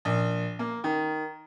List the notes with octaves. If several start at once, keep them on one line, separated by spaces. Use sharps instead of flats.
A#1
A#3
D#3